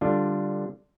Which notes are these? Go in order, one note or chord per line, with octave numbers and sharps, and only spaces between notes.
D3 G3 D4 F4